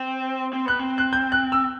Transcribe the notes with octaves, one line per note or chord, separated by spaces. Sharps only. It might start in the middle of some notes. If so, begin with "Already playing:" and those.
Already playing: C4
C4
B3 F#6
C4
F#6
G6
F#6
E6